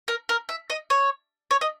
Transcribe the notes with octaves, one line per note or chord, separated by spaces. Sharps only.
A#4
A#4
E5
D#5
C#5
C#5
D#5